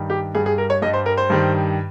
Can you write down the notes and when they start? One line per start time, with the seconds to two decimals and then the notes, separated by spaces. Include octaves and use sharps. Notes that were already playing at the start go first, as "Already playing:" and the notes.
Already playing: G2 D#3 G3
0.10 G4
0.35 G2 G3 G#4
0.46 G#4
0.58 A#4
0.70 C#5
0.82 G2 G3 D#5
0.94 C5
1.06 A#4
1.17 C5
1.30 G2 D#3 G3